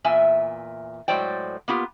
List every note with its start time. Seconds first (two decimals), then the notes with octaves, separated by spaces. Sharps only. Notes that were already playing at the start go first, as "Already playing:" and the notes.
0.04 E2 A#2 E5 G#5
1.08 A2 F#3 G#3 C5 D5 G5
1.68 A#3 B3 F4 G4